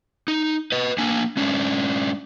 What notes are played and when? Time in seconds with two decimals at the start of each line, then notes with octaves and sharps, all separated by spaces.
0.28 D#4
0.72 B4 D#5
0.98 A#3 D4 G#5
1.37 G#3 C#4 D4